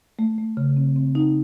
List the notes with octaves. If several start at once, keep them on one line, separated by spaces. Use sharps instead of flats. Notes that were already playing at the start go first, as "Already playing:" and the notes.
A3
A3
C#3
C4
C4
D#4